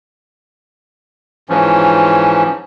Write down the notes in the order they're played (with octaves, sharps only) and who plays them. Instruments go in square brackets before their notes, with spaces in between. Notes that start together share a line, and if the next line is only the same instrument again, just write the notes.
[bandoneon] G#2 E3 F3 C#4